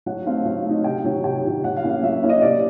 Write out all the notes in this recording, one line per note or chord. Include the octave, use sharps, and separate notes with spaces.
F#3 F#5
A3 C4 D#4 F5
F#3 F5
A3 C4 D#4
C3 G5
D#3 F#3
C3 G5
D#3 F#3
F#3 F#5
F5
A#3 C#4 E4
F5
F#3 E5
A#3 C#4 E4
D#5
C3 D5